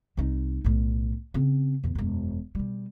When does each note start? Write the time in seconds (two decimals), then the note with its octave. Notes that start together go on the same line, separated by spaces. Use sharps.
0.17 C2 D#4
0.64 B1 A2
1.34 C#3 C4
1.84 E2 A#2
1.95 E1 F#2
2.55 B2 G3